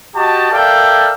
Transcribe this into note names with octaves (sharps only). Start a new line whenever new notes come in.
F#4 G4 D#5 A5
A4 A#4 D5 E5 F5 G5